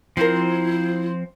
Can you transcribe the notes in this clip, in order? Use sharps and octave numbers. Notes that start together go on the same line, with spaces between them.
F3 C4 E4 F4 A#4 C5